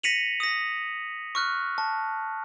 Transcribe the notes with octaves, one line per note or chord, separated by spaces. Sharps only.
A#6 B6 C#7 D#7 F7 F#7
D#6 A#6
C#6 F6 F#6
A5